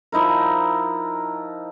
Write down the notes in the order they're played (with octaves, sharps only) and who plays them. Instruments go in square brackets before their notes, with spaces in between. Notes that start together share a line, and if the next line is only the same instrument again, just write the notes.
[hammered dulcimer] F3 D#4 E4 A#4